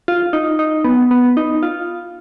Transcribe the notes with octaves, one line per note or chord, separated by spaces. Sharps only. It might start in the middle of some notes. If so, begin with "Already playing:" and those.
F4
D#4
D#4
B3
B3
D#4
F4